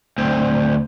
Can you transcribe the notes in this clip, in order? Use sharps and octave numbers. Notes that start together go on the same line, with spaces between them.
D2 C4